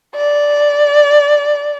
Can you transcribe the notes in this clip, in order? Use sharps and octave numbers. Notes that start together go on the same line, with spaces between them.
D5